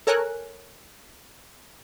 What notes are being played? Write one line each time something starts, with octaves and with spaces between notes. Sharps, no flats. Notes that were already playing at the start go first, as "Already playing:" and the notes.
A4 A#4 C#5 G#5 F#6